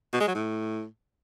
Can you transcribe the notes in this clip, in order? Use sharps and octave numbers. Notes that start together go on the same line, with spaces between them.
B2
G#3
F#3
A2